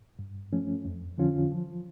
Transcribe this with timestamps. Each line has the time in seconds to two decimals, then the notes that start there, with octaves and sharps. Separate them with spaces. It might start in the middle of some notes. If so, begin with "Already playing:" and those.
0.19 G2
0.53 F3 A3 C#4
0.85 F2
1.18 D3 F3 C#4 F4
1.52 F3